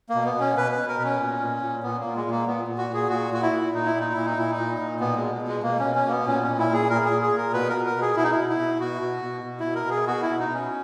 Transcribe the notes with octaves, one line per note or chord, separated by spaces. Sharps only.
A#3
B2
B3
B2
C#4
B2 B4
B4
B2
A#4
B2 C#4
A#2
A#2
A#2
A#2 B3
A#2 A#3
G#3
A#2 A#3
A#2 B3
A#2
F#4
A#2 G#4
A#2 F#4
A#2 F#4
E4
A#2
A#2 D#4
E4
A#2
D#4
A#2 E4
D#4
A#2 E4
D#4
A#2
A#2
B2 B3
B2 G#3
B2
G#3
B2 A#3
C#4
B2
C#4
B2 A#3
B3
A#2 C#4
A#2 C#4
E4
A#2 G#4
A#2 A#4
G#4
A#2
G#4
A#2
A#4
B2 B4
B2 A#4
A#4
B2
G#4
B2 E4
D#4
E4
B2
E4
B2
B2 F#4
B2
B2
B2
E4
B2
A#4
B2 G#4
B2 F#4
E4
B2
D#4
B2 C#4